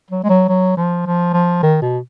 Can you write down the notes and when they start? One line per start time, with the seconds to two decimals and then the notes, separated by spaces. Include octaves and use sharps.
0.11 F#3
0.24 G#3
0.29 F#3
0.49 F#3
0.77 F3
1.06 F3
1.33 F3
1.63 D#3
1.82 B2